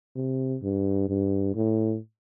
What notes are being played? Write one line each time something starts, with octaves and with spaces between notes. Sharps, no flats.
C3
G2
G2
A2